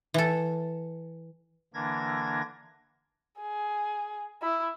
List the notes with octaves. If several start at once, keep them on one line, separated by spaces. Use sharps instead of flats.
E3 A4
D3 E3 A#3 D4 G#6 A#6
G#4
E4